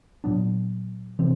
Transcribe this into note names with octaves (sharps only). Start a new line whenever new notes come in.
A#2 F#3 B3 D4
C3 E3 C4